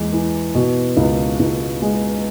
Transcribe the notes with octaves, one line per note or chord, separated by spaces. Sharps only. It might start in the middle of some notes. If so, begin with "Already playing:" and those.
Already playing: E2 G#3
E3
B2
C#2
C#2
G#3